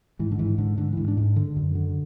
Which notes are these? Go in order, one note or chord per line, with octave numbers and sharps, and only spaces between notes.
G#2 E3
D3
G#2 E3
G#2 D3
G#2 D3
G#2 E3
D4
G#2
D4
D3
F#2
D3